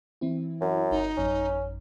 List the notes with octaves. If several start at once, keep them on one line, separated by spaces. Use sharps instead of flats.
E3 C4 E4
F#2
G1 D#4
A1 F#2 C#4